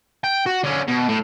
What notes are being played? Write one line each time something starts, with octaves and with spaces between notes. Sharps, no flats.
G5
F#4
D3 C#4
B2
A2